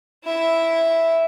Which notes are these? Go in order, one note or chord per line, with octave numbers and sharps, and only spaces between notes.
E4 E5